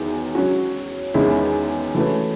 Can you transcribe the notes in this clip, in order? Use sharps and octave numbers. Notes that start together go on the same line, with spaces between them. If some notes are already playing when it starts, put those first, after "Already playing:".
Already playing: E2 D#3 F#3
F#3 C#4 F#4
E2 D#3 G#3 C#4 E4
E3 A3 C#4 F#4 B4